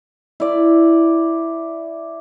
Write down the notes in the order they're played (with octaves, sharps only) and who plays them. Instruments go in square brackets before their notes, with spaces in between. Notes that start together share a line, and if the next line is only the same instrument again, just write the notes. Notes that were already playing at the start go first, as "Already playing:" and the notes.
[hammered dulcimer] E4 D5